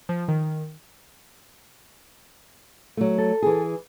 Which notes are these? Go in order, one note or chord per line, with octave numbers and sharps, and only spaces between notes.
F3
D#3
F#3 A3
A4
E3 G#4